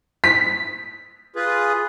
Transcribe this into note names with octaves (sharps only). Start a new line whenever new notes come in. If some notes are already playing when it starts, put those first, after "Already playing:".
B6
F4 G#4 B4